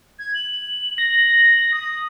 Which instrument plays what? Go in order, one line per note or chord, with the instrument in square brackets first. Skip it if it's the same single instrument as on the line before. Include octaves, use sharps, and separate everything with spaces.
[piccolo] G#6
F#7
[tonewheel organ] A#6
[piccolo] D#6